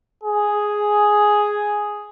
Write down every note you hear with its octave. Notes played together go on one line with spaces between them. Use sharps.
G#4